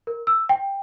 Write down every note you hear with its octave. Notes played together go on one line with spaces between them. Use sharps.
A#4
E6
G5